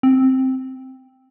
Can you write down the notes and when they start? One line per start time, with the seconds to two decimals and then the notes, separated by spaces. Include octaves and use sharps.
0.03 C4